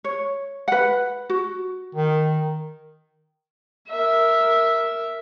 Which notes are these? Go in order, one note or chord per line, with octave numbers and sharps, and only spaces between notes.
C#5
B4 F#5
F#4
D#3
A#4 E5